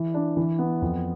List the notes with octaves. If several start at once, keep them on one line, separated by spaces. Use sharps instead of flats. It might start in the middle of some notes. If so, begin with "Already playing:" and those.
Already playing: E3
D4
E3
B3
F2